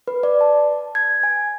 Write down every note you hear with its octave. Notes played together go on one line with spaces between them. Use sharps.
B4
D5
A5
G#6
G#5